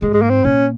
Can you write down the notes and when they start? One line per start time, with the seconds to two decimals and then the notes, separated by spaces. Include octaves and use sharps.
0.02 G#2 G#3
0.13 G#3
0.22 A#3
0.30 C4
0.44 A#2 C#4